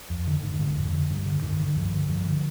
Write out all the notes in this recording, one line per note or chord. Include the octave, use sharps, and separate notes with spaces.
F2
D3 D#3
G#2 D#3
G#2 D3
F2
D3
G2
D3
G2 D#3
D3 D#3
G2 F3
D3
G2 F3
D3